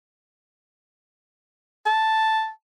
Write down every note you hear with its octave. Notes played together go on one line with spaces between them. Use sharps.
A5